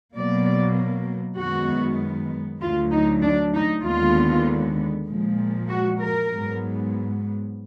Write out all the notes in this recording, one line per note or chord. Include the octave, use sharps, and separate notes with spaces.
B2 F#3 A#3 D5
F#2 D#3 G#3 B3 F#4
D2 D3 F#3 F4
D#4
D4
D#4
D#2 D3 G#3 B3 F4
A#2 F3 G#3
F#4
A#4
G#2 F#3 B3